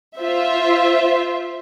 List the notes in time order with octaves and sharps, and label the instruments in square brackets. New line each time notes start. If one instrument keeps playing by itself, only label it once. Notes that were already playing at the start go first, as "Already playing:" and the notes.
[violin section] F4 C5 E5